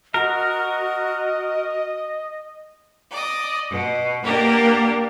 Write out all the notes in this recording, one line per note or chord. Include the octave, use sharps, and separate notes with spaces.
F#4 A#4 D#5
D5 D#5
B2
A#3 B3 D4 G4 A#4